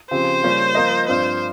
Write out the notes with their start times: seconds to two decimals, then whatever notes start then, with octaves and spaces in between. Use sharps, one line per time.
0.11 C#3 F3 C4 G4 C5
0.43 C#3 G3 A#3 C#4 F4
0.75 F3 A#3 F4 A#4 D#5
1.07 G2 F3 C4 C5